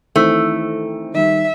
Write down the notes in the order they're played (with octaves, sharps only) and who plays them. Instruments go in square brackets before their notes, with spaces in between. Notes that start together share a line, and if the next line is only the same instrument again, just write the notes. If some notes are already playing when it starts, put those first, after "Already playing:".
[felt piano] D#3 E3 C4 [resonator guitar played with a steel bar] A3
[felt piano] D#3 G3 [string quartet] E5